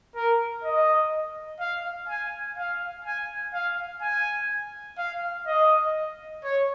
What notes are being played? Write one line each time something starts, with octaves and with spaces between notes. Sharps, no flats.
A#4
D#5
F5
G#5
F5
G#5
F5
G#5
F5
D#5
C#5